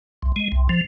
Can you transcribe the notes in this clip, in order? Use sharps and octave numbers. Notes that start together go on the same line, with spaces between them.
C2
G#3
C2
F3